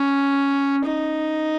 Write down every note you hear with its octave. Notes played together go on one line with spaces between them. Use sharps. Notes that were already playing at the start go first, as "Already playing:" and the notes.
Already playing: C#4
D#4